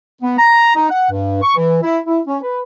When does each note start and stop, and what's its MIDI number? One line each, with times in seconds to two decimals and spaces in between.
0.22 0.38 59
0.38 0.73 82
0.75 0.89 63
0.90 1.09 78
1.11 1.38 43
1.42 1.54 85
1.56 1.77 52
1.83 1.99 64
2.07 2.19 64
2.27 2.38 61
2.43 2.62 71